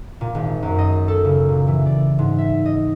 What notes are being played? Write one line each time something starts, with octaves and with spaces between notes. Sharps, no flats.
A#2
G#1
F#2
D#5
A4
C#3
A#2
E3
D5
G#2
E5
D#5